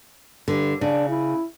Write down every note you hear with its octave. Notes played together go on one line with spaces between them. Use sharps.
G2 D3
C#3 D4
E4